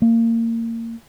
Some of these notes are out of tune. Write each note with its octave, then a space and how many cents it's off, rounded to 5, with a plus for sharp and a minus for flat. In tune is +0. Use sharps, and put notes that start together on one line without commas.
A#3 -25